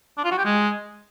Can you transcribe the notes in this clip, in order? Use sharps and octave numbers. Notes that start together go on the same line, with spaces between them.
D4
F4
F#4
G4
G#3